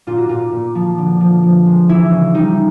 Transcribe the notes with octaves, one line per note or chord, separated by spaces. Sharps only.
A#2 F4
F#4
A#2 F4
A#2
F3
D3
F3
F3
G#3
E3 E4
C#3
G3 D#4